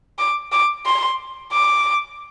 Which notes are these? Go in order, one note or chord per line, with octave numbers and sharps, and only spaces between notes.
D6
D6
C6
D6